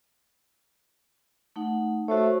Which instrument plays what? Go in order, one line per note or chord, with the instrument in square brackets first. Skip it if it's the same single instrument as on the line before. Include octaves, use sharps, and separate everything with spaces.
[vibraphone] A3 D#4 F#5
[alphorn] A3 [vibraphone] F#4 C5 C#5